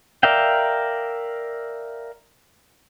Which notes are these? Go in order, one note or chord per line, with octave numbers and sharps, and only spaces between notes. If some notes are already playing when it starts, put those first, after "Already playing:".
A#4 D5 E5 F5 G5